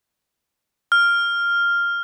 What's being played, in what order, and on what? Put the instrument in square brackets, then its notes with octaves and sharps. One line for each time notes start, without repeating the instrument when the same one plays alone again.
[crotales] F6